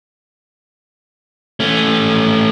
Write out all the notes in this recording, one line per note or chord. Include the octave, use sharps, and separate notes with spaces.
A3 C#4